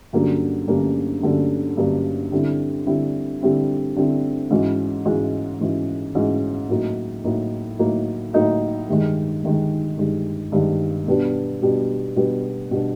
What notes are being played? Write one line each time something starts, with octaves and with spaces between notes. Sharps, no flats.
G2 D3 F#3 A#3 C#4
G2 D3 F#3 A#3 C#4
G2 D3 F#3 A#3 C#4
G2 D3 F#3 A#3 C#4
D3 G3 C4 E4
D3 G3 C4 E4
D3 G3 C4 E4
D3 G3 C4 E4
G#2 E3 G#3 C#4 F#4
G#2 E3 G#3 C#4 F#4
G#2 E3 G#3 C#4 F#4
G#2 E3 G#3 C#4 F#4
A2 F#3 A#3 D#4 F#4
A2 F#3 A#3 D#4 F#4
A2 F#3 A#3 D#4 F#4
A2 F#3 A#3 D#4 F#4
G2 D#3 G#3
G2 D#3 G#3
G2 D#3 G#3
G2 D#3 G#3
B2 G3 B3 D4 F#4
B2 G3 B3 D4 F#4
B2 G3 B3 D4 F#4
B2 G3 B3 D4 F#4